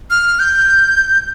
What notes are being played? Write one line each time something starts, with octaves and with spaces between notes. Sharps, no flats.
F6
G6